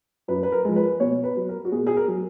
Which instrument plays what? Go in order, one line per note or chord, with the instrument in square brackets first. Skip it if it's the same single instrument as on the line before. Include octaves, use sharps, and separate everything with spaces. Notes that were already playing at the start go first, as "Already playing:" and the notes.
[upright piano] F#2 B4
B4
A#4
F3 G#3
B4
B2 C#5
B4
F#3
A#4
F#4
B2 G#4
G#4
A#4
F#3